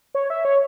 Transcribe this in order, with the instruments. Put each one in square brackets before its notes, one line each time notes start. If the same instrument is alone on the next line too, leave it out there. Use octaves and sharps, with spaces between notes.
[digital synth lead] C#5
E5
C#5